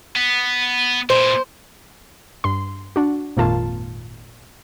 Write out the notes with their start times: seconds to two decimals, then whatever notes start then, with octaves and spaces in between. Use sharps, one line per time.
0.16 B3
1.10 A#2 E4 C5
2.44 G2 C6
2.96 D4 F#4
3.37 G#1 F2 A#2 D#3 F4 A5